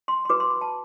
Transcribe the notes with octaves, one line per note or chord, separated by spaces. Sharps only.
C6
C6
F#4 B4 D6
C6
B5
A5